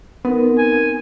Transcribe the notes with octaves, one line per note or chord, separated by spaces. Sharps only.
B3 C4 D#4 A#4
G#5